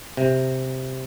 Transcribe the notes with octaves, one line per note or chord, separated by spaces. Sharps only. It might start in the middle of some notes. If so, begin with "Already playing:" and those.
C3